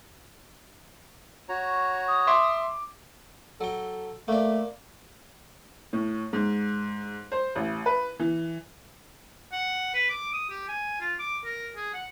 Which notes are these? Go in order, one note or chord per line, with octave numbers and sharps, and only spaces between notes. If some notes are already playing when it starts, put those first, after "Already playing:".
F#4 C#5 A#5
D#6
E5 C6 D6
F#3 A4 G5
A3 A#3 D5
A2
G#2
C5
A1
B4
E3
F#5
B4
D6
D#6
G4
G#5
F4
D6
A#4
G#4
F#5